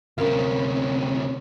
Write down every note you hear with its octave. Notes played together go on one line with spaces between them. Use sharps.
D2 C3 C#4 A#4 F5